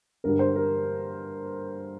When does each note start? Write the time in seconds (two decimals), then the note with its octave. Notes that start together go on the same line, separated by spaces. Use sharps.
0.24 G2 D3 G3 A#4
0.39 C5
0.56 A#4